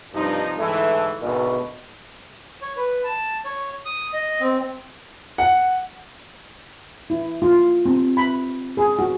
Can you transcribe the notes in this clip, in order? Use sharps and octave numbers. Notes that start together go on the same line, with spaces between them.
G2 C3 F3 D#4
D2 G#2 E3 A3
G#1 D2 B2
C#5
B4
A5
C#5
D#6
D#5
C4
F#5
E4
F4
C4
B5
G#4
F#4